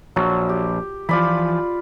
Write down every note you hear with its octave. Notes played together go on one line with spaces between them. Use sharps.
A#1 F#3
G4
E3 F3 F4 D5 B5